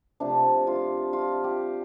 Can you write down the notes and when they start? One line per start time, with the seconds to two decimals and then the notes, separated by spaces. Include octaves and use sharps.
0.20 C3 F3 A3 D4
0.67 F4
1.13 F4
1.44 G4